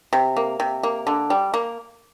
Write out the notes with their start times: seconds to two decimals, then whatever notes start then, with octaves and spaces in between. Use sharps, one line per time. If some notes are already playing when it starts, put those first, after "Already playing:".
0.13 C3
0.37 A#3
0.60 C3
0.83 A#3
1.07 D3
1.30 G3
1.54 A#3